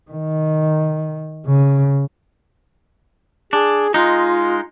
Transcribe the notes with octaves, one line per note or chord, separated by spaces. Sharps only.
D#3
C#3
D4 G#4
G#3 D#4 F4